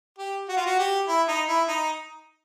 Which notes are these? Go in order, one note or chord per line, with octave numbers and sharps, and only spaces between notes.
G4
F#4
F4
F#4
G4
E4
D#4
E4
D#4